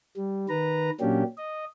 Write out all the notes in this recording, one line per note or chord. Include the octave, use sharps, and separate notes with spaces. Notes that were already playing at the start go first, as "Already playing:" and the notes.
G3
D#3 B4 A#5
A#2 F#3 A#3 C#4 D4 G4
D#5